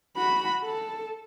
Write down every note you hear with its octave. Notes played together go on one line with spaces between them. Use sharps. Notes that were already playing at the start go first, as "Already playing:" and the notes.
F#4 B5
A4